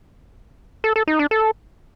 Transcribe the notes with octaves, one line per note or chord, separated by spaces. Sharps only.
A4
A4
D#4
D4
A4